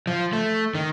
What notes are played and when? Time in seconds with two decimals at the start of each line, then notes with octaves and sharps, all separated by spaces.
0.07 F3
0.33 A3
0.75 D#3